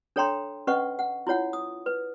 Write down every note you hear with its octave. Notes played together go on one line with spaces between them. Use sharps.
D4 A4 C#5 G5 A#5 C6
C#4 B4 D#5 F#5 C#6
F#5
E4 F4 C#5 F#5
D#6
B4